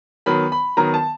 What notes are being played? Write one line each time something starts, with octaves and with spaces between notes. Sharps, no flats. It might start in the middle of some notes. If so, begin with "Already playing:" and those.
D#3 F#3 B3 B5
B5
D#3 F#3 B3 A#5
A5